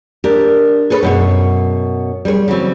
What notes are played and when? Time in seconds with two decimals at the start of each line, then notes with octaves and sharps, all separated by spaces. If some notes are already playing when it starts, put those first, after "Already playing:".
0.24 D4 G4 A#4
0.90 G#4 A4 B4 C#5
1.03 F#2 B2 C#5
2.25 G3 G#4 B4 C#5
2.48 C#3 E3 F#3 C4